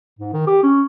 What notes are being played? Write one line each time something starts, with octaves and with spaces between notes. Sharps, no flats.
G#2
D#3
G4
C#4